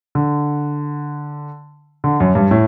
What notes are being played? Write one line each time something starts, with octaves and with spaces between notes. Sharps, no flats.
D3
D3
F#2
G2
A2